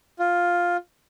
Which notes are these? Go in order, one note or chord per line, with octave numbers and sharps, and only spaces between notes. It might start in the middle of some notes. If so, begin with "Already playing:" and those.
F4